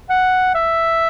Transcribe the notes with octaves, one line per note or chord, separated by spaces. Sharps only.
F#5
E5